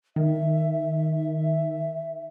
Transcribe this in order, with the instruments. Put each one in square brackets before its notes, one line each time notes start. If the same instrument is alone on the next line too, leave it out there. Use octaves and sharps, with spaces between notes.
[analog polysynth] D#3 [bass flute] E5